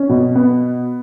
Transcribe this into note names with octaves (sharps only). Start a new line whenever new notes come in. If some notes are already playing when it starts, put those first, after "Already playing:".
Already playing: C#4
B2
B3